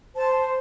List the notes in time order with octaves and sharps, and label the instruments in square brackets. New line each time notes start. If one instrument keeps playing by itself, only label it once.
[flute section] C5 A5